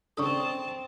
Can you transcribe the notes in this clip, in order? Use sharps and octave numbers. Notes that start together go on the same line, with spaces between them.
C#3 C4 D4 A4 A5 C#6 D#6